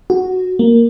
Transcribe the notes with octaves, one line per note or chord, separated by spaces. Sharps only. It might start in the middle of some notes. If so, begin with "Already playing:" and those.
F#4
A#3